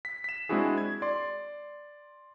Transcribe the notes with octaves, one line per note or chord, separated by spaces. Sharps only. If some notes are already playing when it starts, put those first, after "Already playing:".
B6
B6 E7
G#3 C4 D4 E4 F#4 G#4
G#6
D5 C6